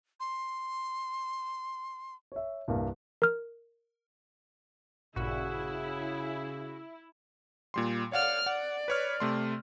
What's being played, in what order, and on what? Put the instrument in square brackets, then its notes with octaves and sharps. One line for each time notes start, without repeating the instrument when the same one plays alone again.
[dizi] C6
[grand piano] C#5 E5
C2 G2 A#3
[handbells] A#4 F6
[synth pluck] A1 G2 A#2 [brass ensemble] C#3 G#4 [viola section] E4 [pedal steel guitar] F#4
[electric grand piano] A#2 G3 C6
[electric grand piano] C#5 F5 F#5 [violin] D5 F6
[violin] D5 [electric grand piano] F#5
[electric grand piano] B4 C#5 F6
C3 A3 C6